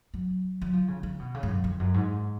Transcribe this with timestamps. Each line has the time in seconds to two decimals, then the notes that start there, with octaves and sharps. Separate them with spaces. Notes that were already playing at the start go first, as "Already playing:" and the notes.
0.14 F#3
0.62 F#3
0.73 F3
0.88 C#3
1.03 C#3
1.20 B2
1.35 C#3
1.43 G#2
1.49 F#2
1.64 F2
1.80 F#2
1.94 G#2